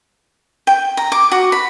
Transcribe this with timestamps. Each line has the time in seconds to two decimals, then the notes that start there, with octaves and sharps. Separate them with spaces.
0.67 G5
0.97 A#5
1.12 D6
1.32 F#4
1.52 B5